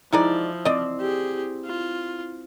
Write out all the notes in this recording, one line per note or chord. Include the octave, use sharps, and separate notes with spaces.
F3 G#3 D#4 E4 D5
C4 D5 D#5
G4 G#4
F4